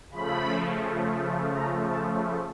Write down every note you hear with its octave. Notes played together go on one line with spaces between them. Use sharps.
C#3 F3 A3 B5
A#5
A5